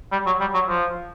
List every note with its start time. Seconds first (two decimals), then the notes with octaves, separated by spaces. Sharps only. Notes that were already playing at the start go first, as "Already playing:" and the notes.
0.12 G3
0.26 F#3
0.40 G3
0.54 F#3
0.69 F3